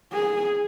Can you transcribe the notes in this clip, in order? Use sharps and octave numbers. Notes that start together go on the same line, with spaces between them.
G#4